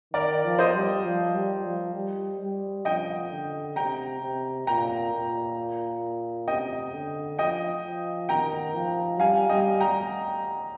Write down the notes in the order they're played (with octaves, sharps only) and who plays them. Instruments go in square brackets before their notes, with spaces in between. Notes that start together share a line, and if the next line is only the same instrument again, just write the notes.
[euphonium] D#3 [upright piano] A#4 D5
[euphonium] F3
[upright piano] C5 D#5
[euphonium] G3
F3
G3
F3
G3
G3
[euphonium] F3 [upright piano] D#5 G5
[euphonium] D3
[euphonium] C3 [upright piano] G5 A#5
[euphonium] C3
[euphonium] A#2 [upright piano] G5 A#5
[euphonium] A#2
[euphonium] C3 [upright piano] D#5 G5
[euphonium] D3
[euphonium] F3 [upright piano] D#5 G5
[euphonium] F3
[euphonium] D#3 [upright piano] G5 A#5
[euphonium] F3
[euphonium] G3 [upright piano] F5 G#5
[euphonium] G3 [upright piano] D#5 G5
[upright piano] G5 A#5